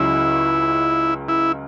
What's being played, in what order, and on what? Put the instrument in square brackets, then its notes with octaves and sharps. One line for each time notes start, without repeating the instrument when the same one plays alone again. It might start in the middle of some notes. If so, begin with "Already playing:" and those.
Already playing: [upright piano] C#2 C#3 F#3 C#4 [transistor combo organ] E4
[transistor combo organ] E4